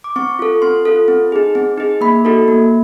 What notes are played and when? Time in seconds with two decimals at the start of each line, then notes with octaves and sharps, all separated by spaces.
0.04 D6
0.16 C4 C#6
0.39 F4 A4
0.62 C4 C6
0.85 F4 A4
1.08 C4
1.32 D#4 G#4
1.55 C4
1.78 D#4 G#4
2.01 A#3 B5
2.25 D#4 F#4 A4
2.48 A#3